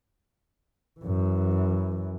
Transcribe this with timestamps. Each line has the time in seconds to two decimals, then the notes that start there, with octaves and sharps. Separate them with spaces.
1.00 F#2 E3